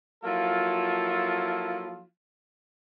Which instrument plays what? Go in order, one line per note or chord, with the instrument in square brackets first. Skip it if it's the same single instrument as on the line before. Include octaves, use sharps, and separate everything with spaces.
[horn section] F3 F#3 A#3 E4 F4 A4